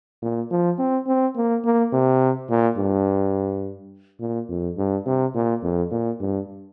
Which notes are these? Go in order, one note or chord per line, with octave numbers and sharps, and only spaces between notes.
A#2
F3
C4
C4
A#3
A#3
C3
A#2
G2
A#2
F2
G2
C3
A#2
F2
A#2
G2